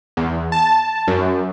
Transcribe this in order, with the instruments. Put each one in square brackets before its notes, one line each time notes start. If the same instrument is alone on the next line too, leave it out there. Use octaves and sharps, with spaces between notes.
[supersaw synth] E2
A5
F#2